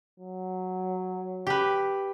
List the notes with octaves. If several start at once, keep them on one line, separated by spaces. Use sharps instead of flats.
F#3
G4 B4